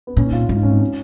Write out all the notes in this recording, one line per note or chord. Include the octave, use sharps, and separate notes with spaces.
B3
A#2 C#4
D#4
F4
G#2 F4
D#4
C#4
D#4
C#4